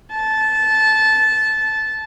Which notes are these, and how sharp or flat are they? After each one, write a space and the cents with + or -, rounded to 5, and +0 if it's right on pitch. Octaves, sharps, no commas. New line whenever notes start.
A5 -15